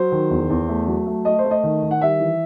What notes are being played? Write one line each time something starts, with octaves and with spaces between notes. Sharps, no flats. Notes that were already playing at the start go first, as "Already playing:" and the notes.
Already playing: F#3 C5
D#3
E2
E2
A3
F#3
A3
A3 D#5
C5
A3
D#5
D#3
D#3
F#5
G3 E5
E3